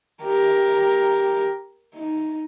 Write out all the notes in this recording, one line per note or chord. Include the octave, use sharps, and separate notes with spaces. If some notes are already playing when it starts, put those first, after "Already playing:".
G4 A#4
D#4